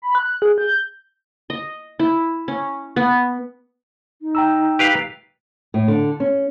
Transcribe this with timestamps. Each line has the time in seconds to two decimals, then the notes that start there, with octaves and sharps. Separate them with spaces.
0.02 B5
0.15 F#6
0.42 G#4
0.58 G6
1.50 D#5
1.99 E4
2.48 C#4
2.96 B3
4.22 D#4
4.35 G5 A#5 E6
4.79 G4 B4 F5
5.74 A2
5.88 D3
6.20 C#4